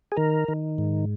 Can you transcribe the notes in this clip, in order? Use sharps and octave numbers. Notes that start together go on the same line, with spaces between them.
G#4
D#3 A#4
D#3
G#2